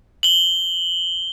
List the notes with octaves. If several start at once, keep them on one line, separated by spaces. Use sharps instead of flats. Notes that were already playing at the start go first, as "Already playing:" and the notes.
F#7 G7